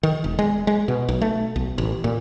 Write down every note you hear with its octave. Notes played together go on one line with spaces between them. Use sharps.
D#3
E1
G#3
G#3
B2
B1
A3
B1
A1
A#2